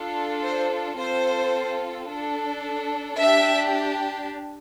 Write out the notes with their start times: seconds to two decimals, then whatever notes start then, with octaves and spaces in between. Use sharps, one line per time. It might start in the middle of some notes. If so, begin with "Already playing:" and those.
Already playing: D4 F4 A4
0.44 C5
0.99 C4 F4 A4 C5
2.10 D4 A4
3.20 D4 G4 E5